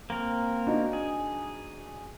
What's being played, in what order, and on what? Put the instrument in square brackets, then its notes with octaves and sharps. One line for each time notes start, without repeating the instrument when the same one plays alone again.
[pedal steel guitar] A#3 C4 A#4
[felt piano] D4 D#4 F#4
[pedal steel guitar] G#4